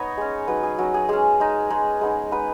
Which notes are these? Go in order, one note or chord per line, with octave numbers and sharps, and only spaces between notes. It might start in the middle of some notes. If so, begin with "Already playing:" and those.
Already playing: B3 D#4 C#5 D#5
G#3 C#4
F#3 D#4 B4
G#4
F#3 C#4 F#4
G#4
G#3 C#4 G#4
G#3 D#4
G#3 D#4
G#3 B3 D#4
G#3 B3 D#4 B4